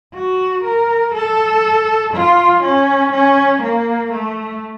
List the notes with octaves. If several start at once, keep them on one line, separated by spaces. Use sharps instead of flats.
F#4
A#4
A4
F4
C#4
C#4
A#3
A3